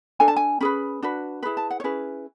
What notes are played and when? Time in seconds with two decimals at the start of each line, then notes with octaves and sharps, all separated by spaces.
0.20 D4 A4 G#5
0.28 A5
0.36 G#5
0.61 C#4 G#4 B4 B5
1.02 D4 F#4 B4
1.43 E4 G#4 B4 B5
1.57 A5
1.71 F#5
1.80 C#5
1.84 C#4 E4 G#4 B4